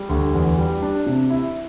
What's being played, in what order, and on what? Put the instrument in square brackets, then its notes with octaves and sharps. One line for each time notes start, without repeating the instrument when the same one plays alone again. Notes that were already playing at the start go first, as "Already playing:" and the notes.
Already playing: [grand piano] G3
D2
E2
G3
D4
C3
E4